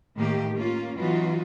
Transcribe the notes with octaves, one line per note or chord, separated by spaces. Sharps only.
A2 D#3 A3 A#3 G4
A#3 C#4 F4
E3 F#3 B3 D#4 F4 F#4